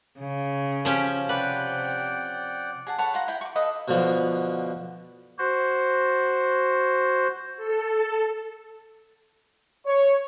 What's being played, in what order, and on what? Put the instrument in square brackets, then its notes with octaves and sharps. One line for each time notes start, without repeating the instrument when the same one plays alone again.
[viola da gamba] C#3
[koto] F3 C#4 G4
[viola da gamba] C3 [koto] B4 [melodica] D5 F#5 G5
[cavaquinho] G#4 F#5 A5
A4 B4 C#5 F#5
F4 F#5 A#5
E4 G5
C#6 D6
F4 A4 B4 D#5
[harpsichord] B2 D3 F3
[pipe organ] F#4 C5
[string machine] A4
[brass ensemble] C#5